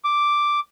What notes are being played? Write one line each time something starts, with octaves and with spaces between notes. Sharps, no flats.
D6